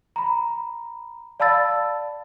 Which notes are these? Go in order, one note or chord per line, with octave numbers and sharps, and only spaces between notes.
A#5 B5
D5 F5 A5 B5 E6 A6